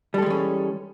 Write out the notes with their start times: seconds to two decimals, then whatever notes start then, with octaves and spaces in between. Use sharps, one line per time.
0.14 G3
0.18 A4
0.22 G#3
0.26 E3
0.30 C#4